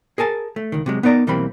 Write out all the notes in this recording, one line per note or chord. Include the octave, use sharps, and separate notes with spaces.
G#4 A#4 G#5 A5
A3
C#2 D#3
C3 F#3 G#3
B3 D#4 A#4 D5 A#5
B1 E3 G3 A#3 C4 B5